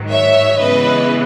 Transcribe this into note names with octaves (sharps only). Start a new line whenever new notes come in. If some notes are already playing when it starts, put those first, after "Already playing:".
Already playing: G#2 D#3 F#3
C#5 E5
C#3 E3 G#3 B3 B4 D#5